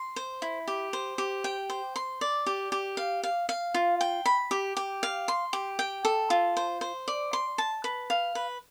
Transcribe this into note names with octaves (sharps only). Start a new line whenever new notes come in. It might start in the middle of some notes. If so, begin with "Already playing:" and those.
Already playing: C6
C5
E4
G4
C5
G4
G5
C5
C6
D5
G4
G4
F5
F5
F5
F4
G5
B5
G4
G4
F5
C6
G4
G5
A4
F4
C5
C5
D5
C6
A5
B4
F5
B4